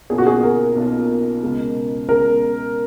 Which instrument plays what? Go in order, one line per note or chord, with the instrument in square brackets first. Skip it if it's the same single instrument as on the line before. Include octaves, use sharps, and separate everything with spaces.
[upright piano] B1 B2 A#3 C#4 F4 [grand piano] G#4
[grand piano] F#4
G#4
A#4
[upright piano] B1 B2 A#3 C#4 F4
C#2 B2 G#3
[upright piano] C#2 B2 G#3 [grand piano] A#4